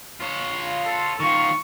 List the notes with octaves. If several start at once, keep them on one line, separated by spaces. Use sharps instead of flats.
F4 C#5
A4
D#3 F4 C#6